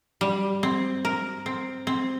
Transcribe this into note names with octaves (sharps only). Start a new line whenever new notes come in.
G3
C4
A#4
C4
C4